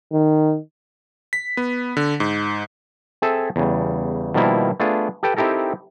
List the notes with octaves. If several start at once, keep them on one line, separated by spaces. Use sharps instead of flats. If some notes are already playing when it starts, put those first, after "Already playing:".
D#3
B6
B3
D3
G#2
C4 G#4 A4 E5 G#5
E2 C#3 G3
B2 D#3 F3 G3 A#3 E4
A3 B3 D4 F4 G#4
G4 A4 B4 G5
C4 D#4 E4 G4 A4 A#4